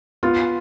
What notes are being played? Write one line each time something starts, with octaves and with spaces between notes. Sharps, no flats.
B3 F4